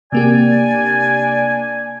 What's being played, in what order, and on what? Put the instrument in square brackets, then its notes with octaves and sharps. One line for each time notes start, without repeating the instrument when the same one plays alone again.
[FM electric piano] C3 A#3 G4 [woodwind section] D4 D5 G#5